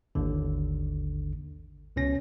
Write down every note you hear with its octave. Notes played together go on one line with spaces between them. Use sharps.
G#1 D#2 D3
C#2 B2 C#4 A#6